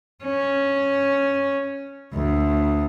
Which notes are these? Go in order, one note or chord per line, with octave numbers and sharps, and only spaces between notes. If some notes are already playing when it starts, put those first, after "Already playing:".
C#4
D2